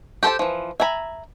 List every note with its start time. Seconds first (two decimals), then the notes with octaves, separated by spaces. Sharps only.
0.23 G4 A4 C5 G5 A5
0.39 E3 F3
0.80 E5 G#5 A#5 B5